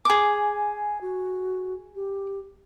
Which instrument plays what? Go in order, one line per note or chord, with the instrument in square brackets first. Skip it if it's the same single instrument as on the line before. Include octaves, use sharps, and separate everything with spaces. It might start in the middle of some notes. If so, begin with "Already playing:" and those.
[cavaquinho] G#4 D6 [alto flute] G#5
[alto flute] F#4
G4